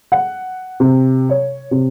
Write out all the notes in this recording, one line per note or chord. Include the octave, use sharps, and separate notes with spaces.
F#5
C3
C#5
C3